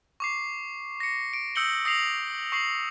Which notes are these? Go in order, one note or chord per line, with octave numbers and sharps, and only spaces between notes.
C#6 D6 C7
A#6 C#7
D7
D#6 E6 G6 C#7 F#7 G7
D#6 A#6 C7 F7 F#7
C#6 C7 F#7